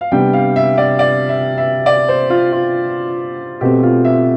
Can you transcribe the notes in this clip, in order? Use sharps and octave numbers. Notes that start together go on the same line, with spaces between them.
F5
C3 G3 B3 D4 G5
F5
E5
D5
D5
E5
E5
D5
C5
F4
F4
B2 A3 C4 G4
F4
E5